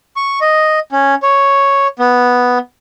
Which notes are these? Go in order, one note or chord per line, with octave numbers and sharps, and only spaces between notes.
C#6
D#5
C#4
C#5
B3